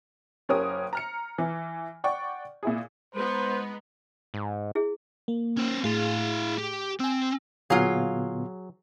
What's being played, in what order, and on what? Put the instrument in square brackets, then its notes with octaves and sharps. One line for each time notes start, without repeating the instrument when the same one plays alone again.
[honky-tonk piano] F#1 C#4 G4 A#4 C#5 D#6
A#5 F6 C#7
E3
D5 F#5 G5 C#6
A#2 E4 G#4
[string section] G#3 B3 D#4 [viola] B4 [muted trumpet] C5
[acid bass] G#2
[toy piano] E4 G#4
[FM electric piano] A#3
[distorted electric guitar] C#4 C5
[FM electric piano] A2 G#4 [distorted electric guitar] E4 F5
[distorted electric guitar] G4
[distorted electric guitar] C4 [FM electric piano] G#5 E6
[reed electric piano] A#2 D3 B3 [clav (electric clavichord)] F#3 G#4 [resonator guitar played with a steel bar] F4 F5